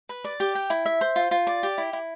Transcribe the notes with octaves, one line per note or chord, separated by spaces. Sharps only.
B4
D5
G4
G5
E4
E5
C5
F4
F4
D5
G4
E4
E4